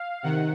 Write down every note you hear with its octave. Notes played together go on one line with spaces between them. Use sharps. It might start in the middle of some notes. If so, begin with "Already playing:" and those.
Already playing: F5
C3 D#3 F#5